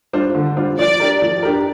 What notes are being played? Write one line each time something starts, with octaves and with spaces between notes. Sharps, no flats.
G3 D4 F4 C5
D3
G3 D4 F4 C5
F3 D5
D4 G4 A#4
F3
D4 G4 A#4